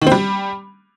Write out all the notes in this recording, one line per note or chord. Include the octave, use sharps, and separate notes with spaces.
D#3
C4
G3